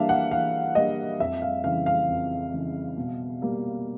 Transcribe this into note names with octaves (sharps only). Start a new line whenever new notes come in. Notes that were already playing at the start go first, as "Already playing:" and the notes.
Already playing: E3 G3 A#3 D4 E5 F5
F#5
E3 F5
G3 A#3 D4 D#5
F2 E5
F5
C#3 E3 F5
F5
F2
C#3 E3
B2
G3 A#3